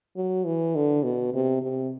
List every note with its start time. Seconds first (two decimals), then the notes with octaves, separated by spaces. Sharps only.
0.17 F#3
0.46 E3
0.75 D3
1.04 B2
1.34 C3
1.62 C3